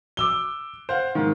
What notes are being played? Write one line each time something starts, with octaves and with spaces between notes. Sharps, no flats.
D6 E6 G7
C5 F5 F#5
G#2 D#3